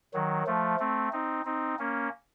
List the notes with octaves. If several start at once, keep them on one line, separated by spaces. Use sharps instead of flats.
D#3 F#3
F3 A3
A3 C4
C4 D#4
C4 D#4
A#3 C#4